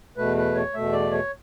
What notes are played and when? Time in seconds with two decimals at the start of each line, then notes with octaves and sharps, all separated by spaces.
0.17 E2 B2 A3 B4
0.37 B4
0.55 C#5
0.74 E2 B2 A3 E5
0.93 D5
1.12 C#5